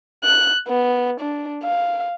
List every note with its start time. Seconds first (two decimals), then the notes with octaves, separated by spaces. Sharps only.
0.24 F#6
0.68 B3
1.21 D4
1.63 F5